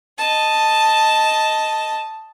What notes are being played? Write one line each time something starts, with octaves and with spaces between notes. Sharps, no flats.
D#5 A5